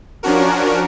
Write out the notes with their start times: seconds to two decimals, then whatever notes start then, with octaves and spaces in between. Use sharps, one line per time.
0.23 F3 C#4 D4 F#4 A#4